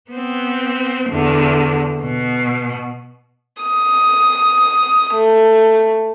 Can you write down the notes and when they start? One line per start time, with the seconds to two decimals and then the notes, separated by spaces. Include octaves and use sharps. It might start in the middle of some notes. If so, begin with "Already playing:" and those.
0.11 B3 C4
1.10 E2 D3
2.01 B2
3.62 D#6
5.13 A3